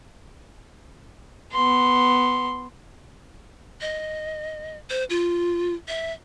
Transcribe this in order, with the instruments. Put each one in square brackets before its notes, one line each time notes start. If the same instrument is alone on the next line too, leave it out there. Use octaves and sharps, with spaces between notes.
[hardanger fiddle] B3 C6
[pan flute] D#5
C5
F4
E5